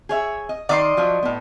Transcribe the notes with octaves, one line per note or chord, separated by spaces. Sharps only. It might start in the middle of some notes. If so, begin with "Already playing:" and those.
G#4 C#5 E5
D#5
D#3 D5 D#5 C6
F3 F#3 D4
A2 B3